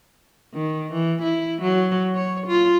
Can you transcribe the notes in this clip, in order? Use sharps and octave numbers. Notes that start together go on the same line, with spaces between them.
D#3
E3
E4
F#3
C#5
F4